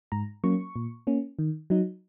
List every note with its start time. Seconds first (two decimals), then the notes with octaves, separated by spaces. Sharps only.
0.12 G#2 A#5
0.44 F#3 A#3 C#4 C#6
0.76 A#2
1.07 A#3 C#4
1.39 D#3
1.70 F#3 D#4